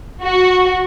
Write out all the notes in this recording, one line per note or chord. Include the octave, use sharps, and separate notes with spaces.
F#4